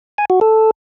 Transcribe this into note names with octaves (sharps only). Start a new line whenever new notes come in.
G#5
F#4
A4